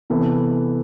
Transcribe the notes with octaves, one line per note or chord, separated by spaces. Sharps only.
C3 E3 B3 A4